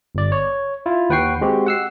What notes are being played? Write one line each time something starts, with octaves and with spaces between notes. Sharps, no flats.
G1 D5
C#5
E4 F4
D#2 B4 F#5 G5 C#6 C7
G#3 C4 F#4 G4
F#5 E6 C7